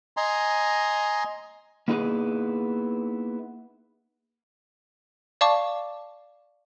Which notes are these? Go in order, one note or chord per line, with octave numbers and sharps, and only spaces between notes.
D#5 G#5 A#5 C6
A#3 B3 D#4 E4 G#4 B4
D5 F5 A5 C#6 D6